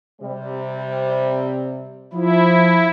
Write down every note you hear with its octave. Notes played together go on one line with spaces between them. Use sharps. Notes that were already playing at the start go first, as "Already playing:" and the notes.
C3 G3 C5
F3 E4